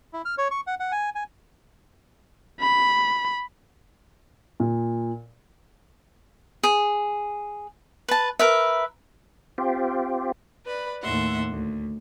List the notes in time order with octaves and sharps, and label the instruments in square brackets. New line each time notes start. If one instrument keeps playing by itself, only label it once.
[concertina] E4
F6
C#5
C#6
F#5
F#5
G#5
G#5
[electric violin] B5
[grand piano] A#2
[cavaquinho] G#4
B4 A5
A#4 B4 E5
[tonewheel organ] C4 F4 G4
[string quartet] B4 D5 B5
D#2 A2 A3 E5 F#5 C6
D2